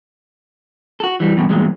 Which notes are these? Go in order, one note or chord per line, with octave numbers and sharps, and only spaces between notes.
F#4 A4
E3 G3
E2 G2 B2
E2 G2 A#2 F#3 G#3